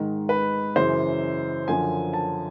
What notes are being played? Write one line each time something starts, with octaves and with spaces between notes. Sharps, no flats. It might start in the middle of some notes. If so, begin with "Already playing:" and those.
Already playing: G#2 D#3
B4
F#2 C#3 E3 C5
F#2 D3 F3 G#5
A5